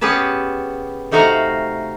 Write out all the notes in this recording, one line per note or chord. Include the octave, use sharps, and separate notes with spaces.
B3 C#4 G4 G#4 B4 A5
C3 A3 D#4 F#4 F5 A#5